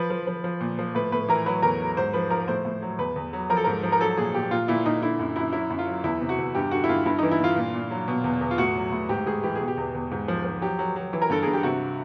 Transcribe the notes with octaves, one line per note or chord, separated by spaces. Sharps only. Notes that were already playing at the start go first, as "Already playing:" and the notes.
Already playing: F3 B4
F3
F3
F3
A#2
F3
A2 B4
A2 B4
E3 A#4
F#3 B4
E2 A#4
F#3
G#2 C5
F3 B4
F3 A#4
A2 C5
A2
F#3
E2 B4
E2
F#3
F3 A#4
A4
G#2 A#4
F3
A#4
F#3 A4
A#2 G#4
A#2 G4
A#2 F4
A#2 E4
A#2 D#4
D3 E4
F#2
F#2 E4
F#3 E4
F#2
F4
F#3
E2 E4
C3
F#4
E2
G2 G4
D3 F#4
E4
G2 F4
G2 E4
E3 D#4
E4
G2 F4
A#2
A#2
F#3
B2
E2
E2
F4
A2 F#4
F#3
A2
G#2 G4
G#2 G#4
E3 G4
G#4
B2
G4
E2
E2
G#2
F3
F3
F#3 G4
F#3
F#3
E3
A#4
G2 A4
G2 G#4
G4
C3 F#4